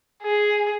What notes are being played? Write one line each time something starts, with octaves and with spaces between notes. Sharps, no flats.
G#4